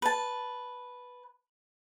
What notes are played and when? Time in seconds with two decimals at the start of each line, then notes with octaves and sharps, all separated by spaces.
0.02 B4 A5